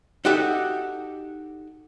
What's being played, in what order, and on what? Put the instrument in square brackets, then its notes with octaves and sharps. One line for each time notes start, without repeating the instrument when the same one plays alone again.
[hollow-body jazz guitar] D#4 F#4 G4 A4 E5